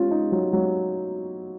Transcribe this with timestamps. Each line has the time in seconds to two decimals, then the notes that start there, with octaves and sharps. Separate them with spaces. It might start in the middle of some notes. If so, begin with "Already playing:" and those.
Already playing: C#4 F4
0.11 D#4
0.32 F#3
0.53 F#3